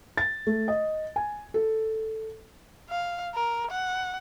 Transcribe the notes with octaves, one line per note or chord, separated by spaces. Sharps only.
A6
A3
D#5
G#5
A4
F5
A#4
F#5